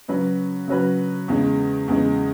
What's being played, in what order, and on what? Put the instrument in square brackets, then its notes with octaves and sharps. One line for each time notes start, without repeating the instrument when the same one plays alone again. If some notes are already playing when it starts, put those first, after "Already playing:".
[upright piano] C#3 F#3 C#4 F#4 B4
C#3 F#3 C#4 F#4 B4
E2 C#3 G#3
E2 C#3 G#3